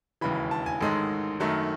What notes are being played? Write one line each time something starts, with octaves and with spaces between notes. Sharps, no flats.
E1 D#2 C#3 E3 B5
A5
G#5
A1 G#2 D#3 G#3 A4
F#2 D#3 F#3 A3